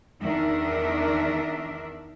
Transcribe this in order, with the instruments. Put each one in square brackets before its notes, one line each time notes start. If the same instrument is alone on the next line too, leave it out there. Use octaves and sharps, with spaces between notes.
[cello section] E2 D#3 D4 D#4 A#4 E5